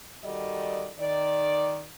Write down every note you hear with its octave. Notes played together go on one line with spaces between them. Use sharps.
D#3 G3 F#4 A4 D5 D#5
D#3 D5